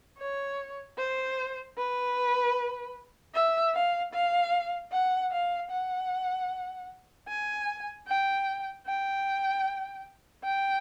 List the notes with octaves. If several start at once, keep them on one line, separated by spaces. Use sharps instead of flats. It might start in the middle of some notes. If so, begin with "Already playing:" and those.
C#5
C5
B4
E5
F5
F5
F#5
F5
F#5
G#5
G5
G5
G5